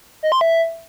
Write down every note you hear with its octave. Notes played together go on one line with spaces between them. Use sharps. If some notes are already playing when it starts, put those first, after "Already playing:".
D#5
C6
E5